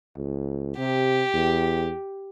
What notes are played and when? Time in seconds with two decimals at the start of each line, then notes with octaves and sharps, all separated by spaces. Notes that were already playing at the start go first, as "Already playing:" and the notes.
0.17 C#2
0.77 C3 G4
1.33 E2